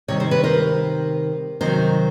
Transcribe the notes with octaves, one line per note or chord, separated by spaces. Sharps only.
C3 D#3 G3 C#5
C5
B4
A#4 C5
C3 D#3 F#3 A#4 C5